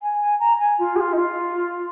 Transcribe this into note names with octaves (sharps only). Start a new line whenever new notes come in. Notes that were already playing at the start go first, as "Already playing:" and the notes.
G#5
G#5
A#5
G#5
F4
G#4
F4
D#4
F4